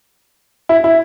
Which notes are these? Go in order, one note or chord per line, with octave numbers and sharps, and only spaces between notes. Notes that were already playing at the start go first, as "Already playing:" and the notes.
E4
E4